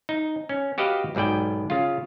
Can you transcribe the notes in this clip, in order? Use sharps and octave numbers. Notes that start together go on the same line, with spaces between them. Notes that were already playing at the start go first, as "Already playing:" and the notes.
D#4
C#4
F#4 G4 B4 D#5 F5
B1 G#2 B2 D5 G5
C#3 F4